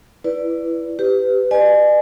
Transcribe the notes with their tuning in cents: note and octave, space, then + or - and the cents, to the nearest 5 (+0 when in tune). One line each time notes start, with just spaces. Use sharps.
E4 +20 B4 +0 D5 -10
G4 +0 B4 +25
B4 +0 D5 +45 G#5 +25